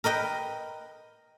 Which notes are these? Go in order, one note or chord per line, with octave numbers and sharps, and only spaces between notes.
A#4 B4 D#5 G5